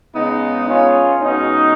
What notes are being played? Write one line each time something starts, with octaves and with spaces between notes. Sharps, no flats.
C#3 G#3 B3 D#4
C#4 F4
B2 G#3 C#4 D#4